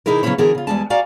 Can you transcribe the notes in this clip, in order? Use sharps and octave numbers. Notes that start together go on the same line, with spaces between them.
C3 E3 D#4 E4 G#4 A#4
C#3 F#3 B3 C#4 E4 C#5
D3 E3 F#4 G#4 A#4
C#3 F4
E2 G2 G3 G#3 G#5 A5
F#4 D5 F5 G#5 A#5